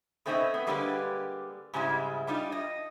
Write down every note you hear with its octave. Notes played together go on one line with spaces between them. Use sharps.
B2 A3 C4 C#4 D#4 D#5
B3
D3 G3 G#3 A#3 G4 B4
G#2 C#3 G3 G#3 E4
G3 D4 D#4 F4
D#5